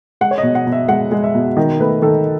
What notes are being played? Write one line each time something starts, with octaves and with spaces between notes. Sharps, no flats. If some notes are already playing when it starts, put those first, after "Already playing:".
G#3 F#5
C#5
D#5
B2
F#5
B2
E5
G#3 F#5
G#3
E5
B2
D#3 D#5
A3 B4
D#3 A4